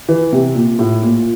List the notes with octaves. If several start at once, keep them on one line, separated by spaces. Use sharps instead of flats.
E3
C3
A#2
A2
A#2